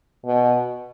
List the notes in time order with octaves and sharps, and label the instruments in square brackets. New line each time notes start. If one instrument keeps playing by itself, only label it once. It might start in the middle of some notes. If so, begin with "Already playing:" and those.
[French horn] B2